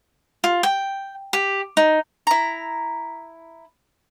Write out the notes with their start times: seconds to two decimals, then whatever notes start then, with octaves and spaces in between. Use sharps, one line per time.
0.44 F4
0.63 G5
1.33 G4
1.77 D#4
2.27 E4 A#5